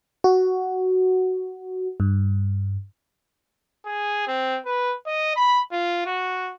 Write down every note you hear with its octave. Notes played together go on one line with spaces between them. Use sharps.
F#4
G2
G#4
C4
B4
D#5
B5
F4
F#4